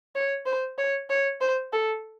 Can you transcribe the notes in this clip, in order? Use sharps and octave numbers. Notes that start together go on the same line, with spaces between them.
C#5
C5
C#5
C#5
C5
A4